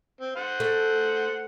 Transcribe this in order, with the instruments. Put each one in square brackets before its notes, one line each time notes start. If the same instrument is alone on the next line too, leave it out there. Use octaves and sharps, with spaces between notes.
[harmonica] C4
C5 F#5
[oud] A3